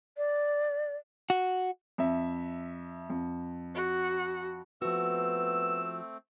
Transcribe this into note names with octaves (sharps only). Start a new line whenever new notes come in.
D5
F#4
F2 E5
F2
F#4
F3 A3 B3 C4 F#4 E6